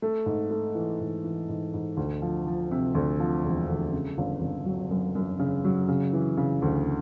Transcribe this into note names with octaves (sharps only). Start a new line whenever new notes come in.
A3
G#2
A3
E3
G#2
E3
G#2
G#2
D2
F3
F3
C3
D2
F3
E1
D2
C#3
G1
G1
F#3
F#2
F#2
C#3
F#3
C#3
E3
C#3
D2